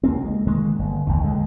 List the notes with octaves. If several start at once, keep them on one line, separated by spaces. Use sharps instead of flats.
C#2 A#3 C4
G#3
D#3 G#3 A#3
G1
G1 D#2
C#2 D3 G#3